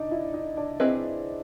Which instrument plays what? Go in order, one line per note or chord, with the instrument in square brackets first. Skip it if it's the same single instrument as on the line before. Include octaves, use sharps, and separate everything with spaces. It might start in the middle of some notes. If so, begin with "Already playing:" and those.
Already playing: [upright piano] D4 D#4 D5 D#5
E4 E5
D#4 D#5
D4 D5
[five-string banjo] C4 E4 G#4 B4 D#5